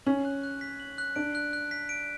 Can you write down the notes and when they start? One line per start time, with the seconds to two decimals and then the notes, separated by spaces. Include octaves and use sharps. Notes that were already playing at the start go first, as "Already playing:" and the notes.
0.06 C#4 F#7
0.25 F#6
0.43 F#6
0.61 B6
0.80 F#7
0.98 F#6
1.16 D4 D7
1.35 F#6
1.53 F#6
1.71 B6
1.89 D7